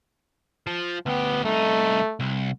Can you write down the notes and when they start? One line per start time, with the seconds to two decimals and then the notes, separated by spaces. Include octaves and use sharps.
0.67 F3
1.06 D2 B3 G4
1.45 C2 A3 D#4
2.20 C2